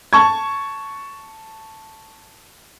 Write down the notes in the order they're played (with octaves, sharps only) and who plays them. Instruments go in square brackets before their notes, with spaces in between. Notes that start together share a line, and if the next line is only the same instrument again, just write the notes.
[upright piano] A5 C#6 G#6